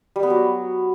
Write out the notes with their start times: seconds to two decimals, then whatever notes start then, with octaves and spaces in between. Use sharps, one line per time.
0.16 G3
0.23 B3
0.30 F#3